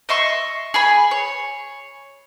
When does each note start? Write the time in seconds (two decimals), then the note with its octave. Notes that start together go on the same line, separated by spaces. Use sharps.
0.09 D#5 E5 C6 C#6
0.74 G#4 G#5 B5
1.11 C#5